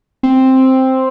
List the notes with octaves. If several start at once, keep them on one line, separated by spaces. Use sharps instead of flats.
C4